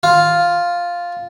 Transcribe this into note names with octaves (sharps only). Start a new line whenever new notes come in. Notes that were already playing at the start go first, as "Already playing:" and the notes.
F4